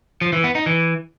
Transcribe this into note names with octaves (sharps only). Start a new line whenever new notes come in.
F3
E3
B3
D#4
E3